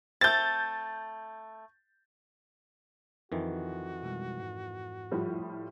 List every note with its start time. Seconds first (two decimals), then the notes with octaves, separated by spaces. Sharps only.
0.21 A3 C4 G6 A6
3.32 F2 D#3 E3 F#4
4.03 B2 G3 G#3
4.40 G#2
5.11 A2 F3 G3